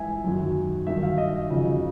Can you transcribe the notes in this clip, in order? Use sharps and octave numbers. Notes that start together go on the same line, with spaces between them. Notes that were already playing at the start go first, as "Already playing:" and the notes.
Already playing: G#2 E3 E5 G#5
F#2 D#3 F#3
G2 D#3 F#3 E5
F5
D#5
F2 C#3 F#3